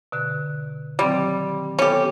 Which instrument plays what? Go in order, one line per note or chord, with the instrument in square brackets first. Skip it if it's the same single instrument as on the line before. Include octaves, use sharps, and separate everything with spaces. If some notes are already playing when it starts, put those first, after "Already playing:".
[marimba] B2 D3 F#6
[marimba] D#3 F#3 C4 [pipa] G3
[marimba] B3 A4 [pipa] C#4 G4